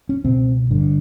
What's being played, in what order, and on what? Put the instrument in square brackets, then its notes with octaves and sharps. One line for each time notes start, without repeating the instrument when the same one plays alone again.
[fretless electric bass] C#4
C#2 B2 C4
G1 G2 D3